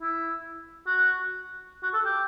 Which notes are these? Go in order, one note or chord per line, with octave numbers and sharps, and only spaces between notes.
E4
F#4
F#4
A4
G4